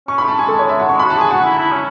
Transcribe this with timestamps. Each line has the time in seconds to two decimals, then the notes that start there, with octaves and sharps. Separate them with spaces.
0.08 C#4 C#6
0.18 A3 B5
0.28 A5
0.36 G#3 G#5
0.48 G#3 A4
0.59 C#5
0.69 E5
0.79 F#5
0.89 G#3 C#6
0.99 F#4 B5
1.10 A5
1.17 G#4 G#5
1.30 F#4 F#5
1.44 E4
1.58 E4
1.72 C#4